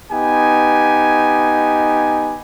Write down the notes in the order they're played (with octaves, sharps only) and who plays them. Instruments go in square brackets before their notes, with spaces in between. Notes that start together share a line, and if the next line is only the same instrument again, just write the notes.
[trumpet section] B3 D#4 G4 G#5